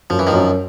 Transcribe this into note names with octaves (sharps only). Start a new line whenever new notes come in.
F#2 F3
E3
D#3 F3
F#2